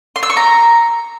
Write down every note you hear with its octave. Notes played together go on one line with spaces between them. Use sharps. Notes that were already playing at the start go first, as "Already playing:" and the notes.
C6
E6
C#6
A#5